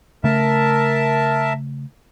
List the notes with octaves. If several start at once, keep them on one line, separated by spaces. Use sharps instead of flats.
C#3 A3 A#4 E5 A5